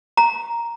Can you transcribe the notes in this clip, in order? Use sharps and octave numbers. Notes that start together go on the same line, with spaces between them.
A#5